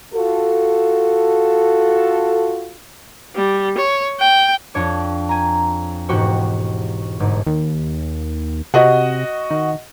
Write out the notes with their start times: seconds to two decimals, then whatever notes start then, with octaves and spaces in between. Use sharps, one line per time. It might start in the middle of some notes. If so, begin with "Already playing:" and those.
0.14 F4 F#4 A4
3.36 G3
3.78 C#5
4.20 G5
4.74 F2 D4 C#5 D6
5.29 G#5 A#5
6.09 E1 G#2 F#4 G4 C5 C#6
7.20 G1 G#2
7.46 D#2
8.74 C3 F#4 D#5 F#5
9.50 D#3